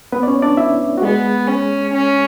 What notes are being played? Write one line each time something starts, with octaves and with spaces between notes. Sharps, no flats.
B3 B4
D5
C#4 C#5
D4 D5
E4 E5
F#4
G#3 B3 G#4
C#4
C#4